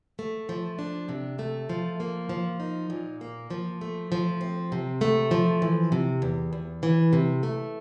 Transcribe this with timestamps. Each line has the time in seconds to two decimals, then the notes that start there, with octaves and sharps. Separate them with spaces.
0.19 A3
0.49 F3
0.79 D4
1.09 C3
1.39 A3
1.69 F3
2.00 A#3
2.29 F3
2.60 D#4
2.90 A#2
3.21 A#3
3.51 F3
3.81 A3
4.12 F3
4.41 C4
4.72 C3
5.01 A3
5.31 F3
5.62 E3
5.92 C3
6.22 E2
6.53 E2
6.83 E3
7.13 C3
7.43 A3